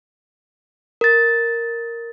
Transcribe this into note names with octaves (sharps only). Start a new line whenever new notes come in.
A#4 A6